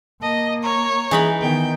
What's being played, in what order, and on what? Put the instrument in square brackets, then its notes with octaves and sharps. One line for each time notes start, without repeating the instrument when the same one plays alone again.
[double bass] A#3 [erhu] D#5 [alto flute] A5
[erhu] C#5 [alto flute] A#5
[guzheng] E3 D#4 B5 [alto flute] G#4
[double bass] D#3 [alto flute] B3 [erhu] G5